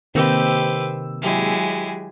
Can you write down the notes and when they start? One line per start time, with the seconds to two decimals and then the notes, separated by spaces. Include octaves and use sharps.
0.15 C3 D#3 A#3 G4 B4 C5 E6
1.22 F#3 G#3 E4 G4 G#4